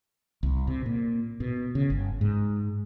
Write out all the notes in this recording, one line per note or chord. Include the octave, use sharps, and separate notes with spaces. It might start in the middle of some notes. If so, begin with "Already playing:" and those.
C2
C3
A#2
B2
C#3
G1
G#2